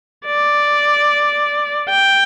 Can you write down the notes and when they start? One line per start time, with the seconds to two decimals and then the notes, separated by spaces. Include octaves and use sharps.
0.26 D5
1.90 G5